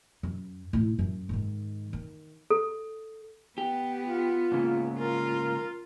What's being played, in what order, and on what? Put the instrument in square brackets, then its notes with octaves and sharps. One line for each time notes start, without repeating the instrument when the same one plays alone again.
[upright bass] F#2
A2 E4
F#2
G#2 D#3
D#3
[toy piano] A4
[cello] B3 [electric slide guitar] G4
[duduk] F4
[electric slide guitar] G#2 C#3 A#3
[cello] F4 [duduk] A#4